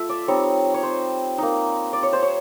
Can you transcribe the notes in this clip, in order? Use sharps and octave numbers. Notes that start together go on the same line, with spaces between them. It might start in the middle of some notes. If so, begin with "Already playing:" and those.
Already playing: A3 F4 E5
D5
G3 C4 D#4 C#5
C#5
C5
A#3 D#4
D5
C#5
C5
C#5